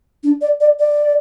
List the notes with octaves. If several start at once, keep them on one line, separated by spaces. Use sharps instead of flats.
D4
D5
D5
D5